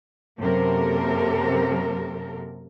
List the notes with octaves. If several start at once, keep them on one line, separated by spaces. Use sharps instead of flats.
F#2 C3 A#3 A4 A#4